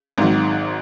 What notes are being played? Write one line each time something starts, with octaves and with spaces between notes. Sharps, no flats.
G#1 G#2 D#3 F#3